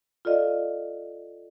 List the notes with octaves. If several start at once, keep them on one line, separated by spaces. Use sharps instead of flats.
F4 A4 D5 D#5 F5